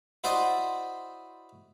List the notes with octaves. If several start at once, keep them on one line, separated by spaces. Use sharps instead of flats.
E4 F#4 C5 D5 D#5